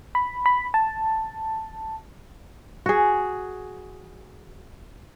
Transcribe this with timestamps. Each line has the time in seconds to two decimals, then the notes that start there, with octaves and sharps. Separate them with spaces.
0.15 B5
0.46 B5
0.74 A5
2.86 F#4 G#4